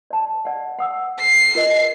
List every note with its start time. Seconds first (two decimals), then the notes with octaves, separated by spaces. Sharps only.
0.10 D5 A5
0.45 D5 F#5
0.79 F#5 D#6 E6
1.20 C7
1.55 F4 A#4 D#5